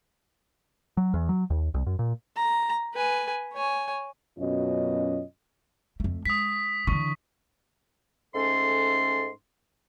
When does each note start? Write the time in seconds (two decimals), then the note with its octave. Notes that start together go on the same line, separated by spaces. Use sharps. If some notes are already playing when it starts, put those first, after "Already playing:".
0.97 F#3
1.14 E2
1.29 F#3
1.50 D#2
1.74 C2
1.87 F#2
1.99 A#2
2.37 A#5
2.94 B4 G#5
3.53 C#5 G#5
4.38 F#2 B2 C#4 F4 D#5
6.00 F2 A3
6.26 G#3 D#6 B6
6.87 D3 E3 C#6
8.35 G#2 A3 C#4 A4 C6